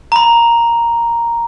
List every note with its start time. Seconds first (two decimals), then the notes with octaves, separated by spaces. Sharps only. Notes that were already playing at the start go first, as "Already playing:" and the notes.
0.12 A#5
0.16 B5